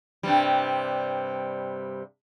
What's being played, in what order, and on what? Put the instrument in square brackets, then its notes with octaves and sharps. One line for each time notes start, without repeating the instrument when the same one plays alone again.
[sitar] G2 C3 G3